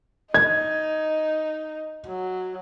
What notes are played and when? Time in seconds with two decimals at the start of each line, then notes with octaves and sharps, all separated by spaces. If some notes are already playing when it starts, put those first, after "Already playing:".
0.34 D#4 G#6
2.07 F#3